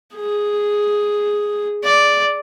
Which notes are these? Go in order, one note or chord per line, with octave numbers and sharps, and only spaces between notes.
G#4
D5